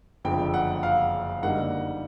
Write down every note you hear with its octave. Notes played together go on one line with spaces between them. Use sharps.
F#1 F2 D3 G5
F#5
F5
F#2 D3 G3 A#3 D#4 F#5